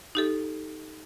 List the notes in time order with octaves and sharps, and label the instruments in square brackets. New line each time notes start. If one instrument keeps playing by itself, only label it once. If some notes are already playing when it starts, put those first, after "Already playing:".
[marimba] D#4 G4 A4